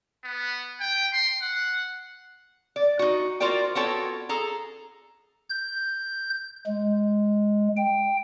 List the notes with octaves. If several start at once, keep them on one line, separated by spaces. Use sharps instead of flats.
B3
G5
C6
F#5
D5
D#4 F#4
F4 F#4 A#4 C5 D5 G5
B3 F4 F#4 A4 C#5 G5
G#4 A4 A#5
G6
G#3
G5